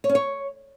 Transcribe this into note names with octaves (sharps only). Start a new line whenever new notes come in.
C#5
C#4
C#5